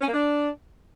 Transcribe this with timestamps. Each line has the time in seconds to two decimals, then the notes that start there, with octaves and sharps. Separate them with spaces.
0.01 C#4
0.07 A#3
0.13 D4